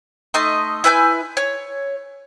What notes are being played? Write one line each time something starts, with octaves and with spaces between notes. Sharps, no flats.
A3 D#4 D#5 C6
E4 B4 G#5 G6
C#5